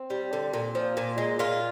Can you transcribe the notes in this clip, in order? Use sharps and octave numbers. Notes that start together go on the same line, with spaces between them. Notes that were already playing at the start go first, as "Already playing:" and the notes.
Already playing: C4
G3
D3
A#2
F3
A#2
G#3
A#2 F4